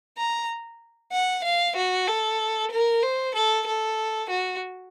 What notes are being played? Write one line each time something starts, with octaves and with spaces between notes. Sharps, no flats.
A#5
F#5
F5
F#4
A4
A#4
C5
A4
A4
F#4